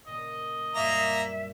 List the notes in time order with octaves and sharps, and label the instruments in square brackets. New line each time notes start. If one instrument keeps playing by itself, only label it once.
[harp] A#2 C#3 [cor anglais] D#5
[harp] F#2 A#2 G3 [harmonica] A#3 A#5 [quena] E5